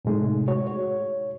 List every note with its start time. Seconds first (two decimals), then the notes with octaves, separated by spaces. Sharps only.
0.05 A2 C3 G#3 A3 D#4
0.48 F#4 C#5
0.67 C#5